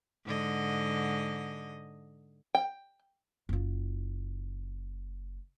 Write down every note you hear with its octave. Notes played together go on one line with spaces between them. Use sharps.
G#2 D3 D#5
G5
F#1 F4